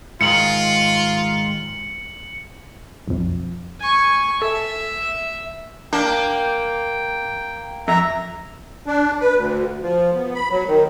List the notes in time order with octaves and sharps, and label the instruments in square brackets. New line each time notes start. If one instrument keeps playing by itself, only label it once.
[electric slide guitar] G#2 D#3 G#3 [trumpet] F4 [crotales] C#7 F#7
[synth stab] B1 F2
[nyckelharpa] G#5 C#6
[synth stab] A4 [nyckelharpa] E5
[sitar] A#3 [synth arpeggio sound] D4 [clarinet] G5
[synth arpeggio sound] F2 [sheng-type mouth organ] E5 A#5
[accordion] D4
B4
D2
F3
B3
B5
F#3
D#3